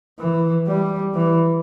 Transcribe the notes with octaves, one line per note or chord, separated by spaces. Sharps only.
E3
G3
E3